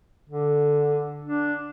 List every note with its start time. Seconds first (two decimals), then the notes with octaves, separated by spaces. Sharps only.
0.29 D3
1.25 D4